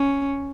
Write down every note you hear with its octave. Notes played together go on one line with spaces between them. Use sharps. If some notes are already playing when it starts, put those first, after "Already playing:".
Already playing: C#4